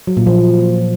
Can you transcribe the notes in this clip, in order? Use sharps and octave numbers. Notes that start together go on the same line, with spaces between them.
F#3
A#2
F3